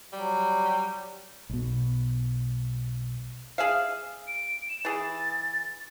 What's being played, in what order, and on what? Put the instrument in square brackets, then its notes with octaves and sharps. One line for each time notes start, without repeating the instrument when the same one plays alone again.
[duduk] F#3 [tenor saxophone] G3
[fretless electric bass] B1 B2
[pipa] G#4 E5 F5
[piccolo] D7
E7
[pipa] E3 G#4 [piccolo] A6